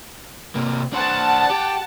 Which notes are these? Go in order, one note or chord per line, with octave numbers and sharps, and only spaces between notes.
C3 A#3
D4 C5 F#5 A5
G4